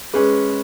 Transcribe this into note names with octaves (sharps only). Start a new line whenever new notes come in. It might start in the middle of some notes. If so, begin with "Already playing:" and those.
G#3 C#4 G#4 B4